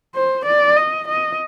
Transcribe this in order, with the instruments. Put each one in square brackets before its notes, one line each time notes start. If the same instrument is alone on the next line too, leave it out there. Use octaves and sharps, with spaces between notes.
[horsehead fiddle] C5
D5
D#5
D#5